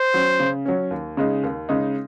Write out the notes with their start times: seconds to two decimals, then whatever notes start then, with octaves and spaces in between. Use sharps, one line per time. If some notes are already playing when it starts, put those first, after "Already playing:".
Already playing: C5
0.14 F#3 C#4
0.40 C#3
0.65 F#3 C#4
0.91 D#2
1.17 C#3 G#3 D#4
1.43 D#2
1.69 C#3 G#3 D#4